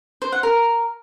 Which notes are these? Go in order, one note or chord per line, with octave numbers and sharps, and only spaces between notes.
C5
F#5
A#4